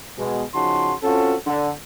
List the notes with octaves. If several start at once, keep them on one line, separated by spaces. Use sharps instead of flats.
B2 G#3
C#3 F3 D#4 F#4 A5 C6
C4 C#4 F4 F#4 A4
D3